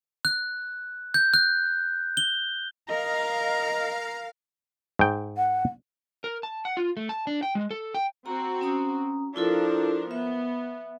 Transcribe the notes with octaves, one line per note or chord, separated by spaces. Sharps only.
F#6
G6
F#6
G7
A#4 D#5 F5 A#5
G#2 G5
F#5
A#4
A5
F#5
F4
A3
A5
D4
G5
G#3
A4
G5
C4 F#4 A#5
C#4 A#5 D#6
F3 D4 E4 F4 A4 A#4
B3 E5